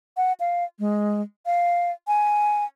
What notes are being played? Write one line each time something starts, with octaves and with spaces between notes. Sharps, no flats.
F#5
F5
G#3
F5
G#5